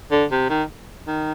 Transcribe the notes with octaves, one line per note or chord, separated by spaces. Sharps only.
D3
C3
D#3
D#3